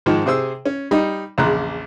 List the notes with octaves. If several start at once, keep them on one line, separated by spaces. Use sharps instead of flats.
G#2 D#3 F3 G#3
C3 G#4 C5 E6
C#4
G3 D#4
A#1 E2 C#3 A#5 C6 F#6